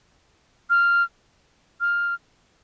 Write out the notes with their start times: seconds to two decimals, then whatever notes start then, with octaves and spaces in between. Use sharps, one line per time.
0.70 F6
1.81 F6